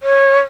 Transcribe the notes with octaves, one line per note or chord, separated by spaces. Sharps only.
C#5